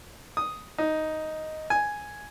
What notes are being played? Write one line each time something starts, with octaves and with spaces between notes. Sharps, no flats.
D#6
D#4
G#5